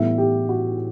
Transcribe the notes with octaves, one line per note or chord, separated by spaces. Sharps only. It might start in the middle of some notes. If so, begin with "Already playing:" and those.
Already playing: A2 E3 G3 B3 E5
G4
F#4